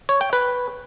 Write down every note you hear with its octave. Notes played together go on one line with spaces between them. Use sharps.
C#5
G5
B4